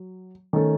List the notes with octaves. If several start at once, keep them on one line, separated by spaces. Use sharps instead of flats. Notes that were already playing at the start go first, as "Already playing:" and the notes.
Already playing: F#3
D#3 A3 C#4 A4